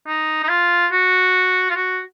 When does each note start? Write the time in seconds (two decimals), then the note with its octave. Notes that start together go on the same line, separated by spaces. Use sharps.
0.07 D#4
0.43 D#4
0.49 F4
0.92 F#4
1.70 F4
1.76 F#4